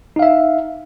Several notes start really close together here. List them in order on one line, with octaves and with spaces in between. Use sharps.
D#4 F5 E5